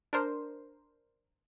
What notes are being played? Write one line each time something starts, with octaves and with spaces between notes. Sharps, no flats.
D4 A#4 C5